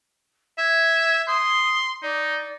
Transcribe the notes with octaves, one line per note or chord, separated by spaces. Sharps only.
E5 G#6
C6 D#6
D#4 D5